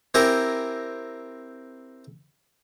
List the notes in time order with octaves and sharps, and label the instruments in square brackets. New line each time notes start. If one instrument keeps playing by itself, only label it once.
[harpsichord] C4 E4 G4 A#4 G#5 A#5